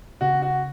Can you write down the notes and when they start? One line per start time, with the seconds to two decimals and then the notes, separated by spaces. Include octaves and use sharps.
0.21 C#3 F#4
0.42 F#4